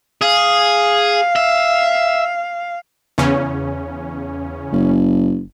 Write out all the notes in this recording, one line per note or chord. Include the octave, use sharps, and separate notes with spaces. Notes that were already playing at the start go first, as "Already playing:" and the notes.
G#4 F5
E5
E2 C#3 C#4
F#1